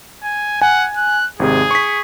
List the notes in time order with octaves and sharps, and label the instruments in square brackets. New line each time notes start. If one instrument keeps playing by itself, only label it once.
[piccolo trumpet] G#5
[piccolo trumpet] F#5 [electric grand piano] G#5
[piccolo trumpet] F#6
[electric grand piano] G#1 C3 G#3 [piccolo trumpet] G#4
[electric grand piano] C#6 B6